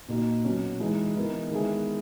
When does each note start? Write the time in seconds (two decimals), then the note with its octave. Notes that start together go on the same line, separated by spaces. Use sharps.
0.09 A#2 A#3 D#4 F#4
0.44 B2 F#3 C#4 F#4
0.80 E3 G#3 D#4
1.15 E3 B3 D#4 A#4
1.50 D#3 G#3 B3 E4 G#4